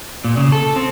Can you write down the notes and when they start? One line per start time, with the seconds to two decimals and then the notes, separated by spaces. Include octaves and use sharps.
0.24 A#2
0.37 C#3
0.52 A4
0.76 C4